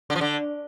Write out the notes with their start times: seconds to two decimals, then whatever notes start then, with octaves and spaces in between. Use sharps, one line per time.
0.10 D3
0.15 F3
0.21 D3